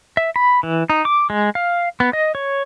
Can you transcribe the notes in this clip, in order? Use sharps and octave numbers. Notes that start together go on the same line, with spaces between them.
E5
B5
E3
D#4
D6
G#3
F5
B3
D#5
C#5